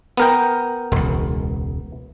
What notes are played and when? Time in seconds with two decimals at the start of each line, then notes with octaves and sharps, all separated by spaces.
0.17 B3 A#4 G5
0.92 E1 C#2